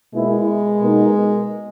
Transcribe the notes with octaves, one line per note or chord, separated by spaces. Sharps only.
B2 G#3 A#3 E4 B4
B2 A#3 D#4 A#4